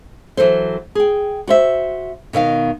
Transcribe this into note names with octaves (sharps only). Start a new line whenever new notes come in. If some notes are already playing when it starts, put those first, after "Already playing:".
E3 F#3 A4 C5
G#4 G5
F#4 C5 E5
B2 D#3 E5 F5